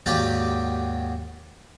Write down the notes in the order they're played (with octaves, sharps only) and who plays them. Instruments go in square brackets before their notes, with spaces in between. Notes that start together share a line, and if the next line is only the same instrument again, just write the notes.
[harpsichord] D#2 G#2 F#3 G4 D5